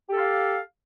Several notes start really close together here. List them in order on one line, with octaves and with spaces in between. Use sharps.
G4 A4 F5